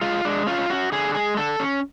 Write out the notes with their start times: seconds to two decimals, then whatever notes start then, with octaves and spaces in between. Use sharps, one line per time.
0.01 G#3 F4
0.25 G#3 D4
0.47 C#4 F4
0.70 C#4 F#4
0.92 D3 G#4
1.14 G#3 G#4
1.37 D3 A4
1.60 C#4